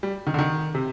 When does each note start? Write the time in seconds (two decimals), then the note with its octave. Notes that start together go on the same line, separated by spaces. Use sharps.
0.03 G3
0.27 D#3
0.34 D3
0.39 D#3
0.75 C3